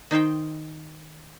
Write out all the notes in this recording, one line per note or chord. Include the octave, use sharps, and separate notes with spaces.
D#3 D#4 C5 G5